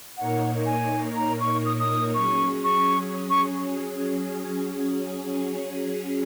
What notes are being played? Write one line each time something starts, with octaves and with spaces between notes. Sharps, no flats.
A#2 A#3 D#4 A#4 C#5 F#5
G#5
A#5
C#6
D#6
D#6
F#3 C#4 G#4 C#6
C#6
C#6